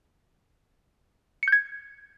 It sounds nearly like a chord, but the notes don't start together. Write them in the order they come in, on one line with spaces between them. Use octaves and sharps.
C#7 G6 G#6